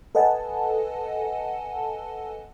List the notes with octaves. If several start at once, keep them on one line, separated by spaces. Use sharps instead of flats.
A4 B4 D#5 F#5 G#5 A5